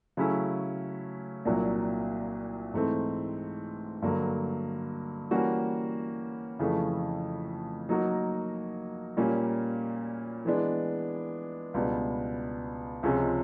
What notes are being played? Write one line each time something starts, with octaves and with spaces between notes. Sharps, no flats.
C#3 F#3 A3 C#4 E4
C2 A#2 F#3 A#3 D4
G#2 E3 A3 C4
G2 D3 F#3 A#3
E3 G3 A#3 C#4 F#4
F2 C#3 E3 A3
F#3 A#3 D#4 F#4 A#4
A#2 G3 A#3 C#4
E3 G#3 B3 D4
C#2 B2 G3 B3 D4
C#2 C3 F3 G#3 C#4